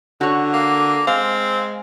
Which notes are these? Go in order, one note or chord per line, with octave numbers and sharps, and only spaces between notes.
D3 F#4 C#5
A#3
G#3 C4 F5